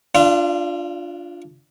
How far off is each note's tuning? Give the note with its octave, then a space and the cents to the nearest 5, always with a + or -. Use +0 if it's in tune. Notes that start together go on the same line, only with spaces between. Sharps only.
D4 +0 F4 +0 F5 -45